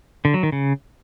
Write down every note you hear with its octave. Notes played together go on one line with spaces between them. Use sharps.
D3
F#3
D#3
C#3